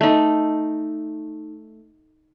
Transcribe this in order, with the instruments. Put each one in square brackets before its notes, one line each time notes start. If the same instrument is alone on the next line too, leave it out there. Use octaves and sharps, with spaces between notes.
[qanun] A3 D#4